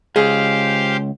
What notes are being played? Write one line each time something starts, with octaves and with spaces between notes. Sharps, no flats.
C#2 G4 G#4 C5 F5